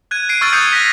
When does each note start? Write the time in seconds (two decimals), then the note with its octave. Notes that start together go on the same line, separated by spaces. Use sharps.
0.11 F#6 G#6 D#7
0.29 G#6 C7 D7 D#7
0.41 C#6 E6 F6 A6 G7
0.53 D#6 G6 G#6 C7 C#7
0.73 F#6 A#6 B6